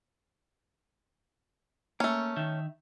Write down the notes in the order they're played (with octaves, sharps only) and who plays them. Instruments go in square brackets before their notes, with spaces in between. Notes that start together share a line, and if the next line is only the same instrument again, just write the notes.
[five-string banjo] A3 C#4 [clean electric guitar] A#3
[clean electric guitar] D#3 D#4 E5